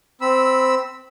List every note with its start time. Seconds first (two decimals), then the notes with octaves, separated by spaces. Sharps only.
0.21 C4 B5 E6